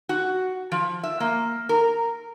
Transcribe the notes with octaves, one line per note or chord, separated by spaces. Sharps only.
F#4
F3
E5
A#3
A#4